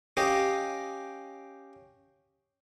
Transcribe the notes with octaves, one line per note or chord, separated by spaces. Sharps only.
C#4 G4 D#5 F5